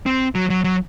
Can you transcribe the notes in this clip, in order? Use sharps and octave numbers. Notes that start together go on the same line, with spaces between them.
C4
F#3
F#3
F#3